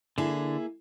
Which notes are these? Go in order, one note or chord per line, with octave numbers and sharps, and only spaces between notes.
D3 A#3 E4 G#4